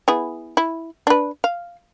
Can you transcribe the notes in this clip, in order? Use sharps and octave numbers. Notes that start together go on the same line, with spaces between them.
B3 E4 G#4
E4
D4 B4
F5